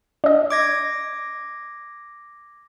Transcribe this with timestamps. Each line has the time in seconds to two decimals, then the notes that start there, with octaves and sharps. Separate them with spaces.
0.24 D4 D#5
0.50 D6 G#6 A#6